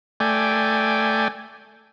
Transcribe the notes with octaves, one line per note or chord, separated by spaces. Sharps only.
A3 D5 G5 G#5